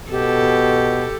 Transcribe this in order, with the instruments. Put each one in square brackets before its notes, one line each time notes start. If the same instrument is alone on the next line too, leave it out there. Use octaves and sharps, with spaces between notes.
[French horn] B2 [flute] G4 [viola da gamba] A4